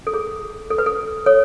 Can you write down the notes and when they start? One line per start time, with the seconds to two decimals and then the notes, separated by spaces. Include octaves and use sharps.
0.07 A4
0.14 G#4
0.70 A4
0.78 B4
0.86 A4
1.26 A4 C#5